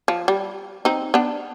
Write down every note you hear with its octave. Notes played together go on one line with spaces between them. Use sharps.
F3
G3
C4 D#4
B3 D4